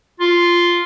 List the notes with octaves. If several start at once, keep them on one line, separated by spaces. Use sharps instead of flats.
F4